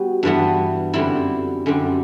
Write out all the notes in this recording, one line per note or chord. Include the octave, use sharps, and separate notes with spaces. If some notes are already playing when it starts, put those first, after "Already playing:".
Already playing: G3 B3 F#4
G2 E3 G3 B3
F#2 D3 G3 C4 E4
F#2 D3 G3 C4